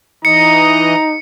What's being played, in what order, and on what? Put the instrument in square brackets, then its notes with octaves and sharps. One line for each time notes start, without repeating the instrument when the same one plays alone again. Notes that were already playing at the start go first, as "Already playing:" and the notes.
[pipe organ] E3 D#5 [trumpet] D#4 [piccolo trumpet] A#5 [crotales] C#7